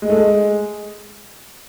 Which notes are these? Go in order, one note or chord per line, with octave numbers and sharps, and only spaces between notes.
G#3
A3
G#3